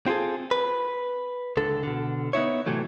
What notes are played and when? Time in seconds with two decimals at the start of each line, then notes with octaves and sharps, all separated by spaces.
0.06 C4 F4 F#4 G#4 A4
0.51 B4
1.57 C#2 D3 A4
1.83 B2 D3
2.33 B3 D#4 E4 C#5
2.66 A2 C3 E3 F#3 A3